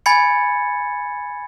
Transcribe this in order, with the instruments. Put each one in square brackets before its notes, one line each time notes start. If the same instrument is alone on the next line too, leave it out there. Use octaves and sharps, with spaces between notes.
[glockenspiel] G#5 B5 G#6 A6 C#7